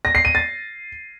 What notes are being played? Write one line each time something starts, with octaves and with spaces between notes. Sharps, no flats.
A#6
C7
D#7
A6